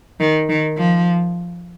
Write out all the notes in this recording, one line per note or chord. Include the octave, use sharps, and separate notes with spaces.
D#3
D#3
F3